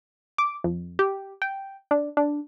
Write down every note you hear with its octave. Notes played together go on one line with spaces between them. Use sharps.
D6
F2
G4
G5
D4
D4